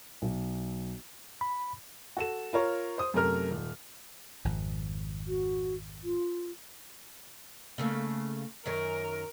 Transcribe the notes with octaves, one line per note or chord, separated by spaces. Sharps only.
B1
B5
F#4 A4 E7
F4 A#4 C#5
C5 D#6
F#2 C3 A3 A#4 F6
D#1
G#1 F2
F#4
F4
C#3 A3 A#3
F#2 D#3 C#4 A#4